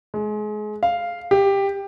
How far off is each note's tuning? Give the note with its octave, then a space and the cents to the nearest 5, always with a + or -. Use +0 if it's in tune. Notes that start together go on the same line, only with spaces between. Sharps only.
G#3 +30
F5 -5
G4 +10